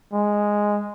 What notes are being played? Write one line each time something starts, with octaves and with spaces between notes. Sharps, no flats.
G#3